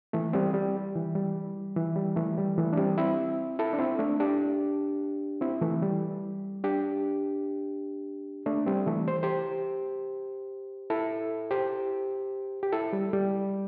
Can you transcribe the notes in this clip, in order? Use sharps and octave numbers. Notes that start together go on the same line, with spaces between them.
E3 A3
G3 C4
G3
E3
G3
E3
G3
E3 A3
G3
E3 A3
D4
G3 C4
C4 E4
E4 A4
D4
C4 E4
A3 D4
D4 G4
C4 E4
E3 A3
G3
D4 G4
A3 D4
G3 C4
E3 A3
C5
G4 C5
E4 A4
G4 C5
G4
E4 A4
G3
G3